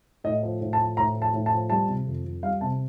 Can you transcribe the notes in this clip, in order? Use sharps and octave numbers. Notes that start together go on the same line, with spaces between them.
A2 D#5
F3
A2
A5
F3
A2 A#5
F3
A5
A2
A5
F3
G3 A5
C3
F2
F2
G3 F5
C3 A5